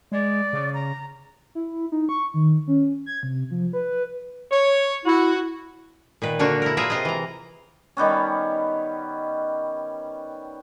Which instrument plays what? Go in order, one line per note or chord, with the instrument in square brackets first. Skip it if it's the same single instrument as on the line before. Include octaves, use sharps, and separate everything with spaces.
[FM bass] G#3 [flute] D5
[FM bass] C#3
[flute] A#5
[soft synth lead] E4
D#4
C#6
D#3
C#4
G#6
C3
F3
B4
[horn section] C#5
[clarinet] E4 [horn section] F#4
[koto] A#2 D#3 B4
D3 A#3 D4 F#4 C#5
E4 A#4
F4 G#4 A#4 B4 E5
C3 F4 D#5
E3 A#5
[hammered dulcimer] D#3 G3 B3 C#4